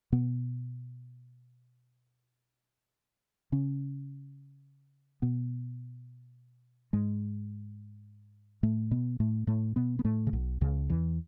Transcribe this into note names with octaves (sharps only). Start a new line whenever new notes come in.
B2 B3
C#3 C#4
B2 B3
G#2 G#3
A2 A3
B2 B3
A2 A3
A2 A3
B2 B3
B3
A2 A3
C#3
B1 B2
C#2 C#3
E2 E3